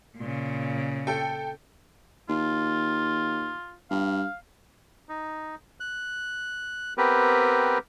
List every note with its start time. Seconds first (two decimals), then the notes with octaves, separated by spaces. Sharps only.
0.17 A#2 C#3
1.07 A4 G5
2.29 D#2 F4
3.91 G2 F5
5.09 D#4
5.80 F#6
6.98 B3 C4 G4 A#4 B4